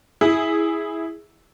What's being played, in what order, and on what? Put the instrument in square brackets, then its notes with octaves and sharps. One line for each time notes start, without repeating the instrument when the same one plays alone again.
[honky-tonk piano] E4 G#4